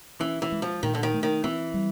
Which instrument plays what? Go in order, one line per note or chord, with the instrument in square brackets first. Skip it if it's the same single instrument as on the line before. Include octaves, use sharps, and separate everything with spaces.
[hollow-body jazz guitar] E3 [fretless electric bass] C#4
[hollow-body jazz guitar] E3
[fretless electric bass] G#3
[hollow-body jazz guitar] F3
[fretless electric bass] A#2 [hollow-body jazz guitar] D#3
[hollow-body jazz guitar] D3
D#3
[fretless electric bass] A3
[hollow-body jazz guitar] D#3
[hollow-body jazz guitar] E3 [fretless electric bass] C4
[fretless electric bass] G3